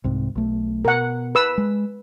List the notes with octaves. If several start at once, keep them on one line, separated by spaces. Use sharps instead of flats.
C2 G#2 C3
B1 A3
B2 A#4 F#5
B4 E6
G#3